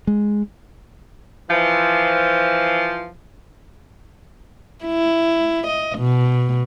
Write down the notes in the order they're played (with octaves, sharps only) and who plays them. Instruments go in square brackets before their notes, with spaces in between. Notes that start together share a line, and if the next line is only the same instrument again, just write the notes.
[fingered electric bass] G#3
[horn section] E3 F3
[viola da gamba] E4
D#5
B2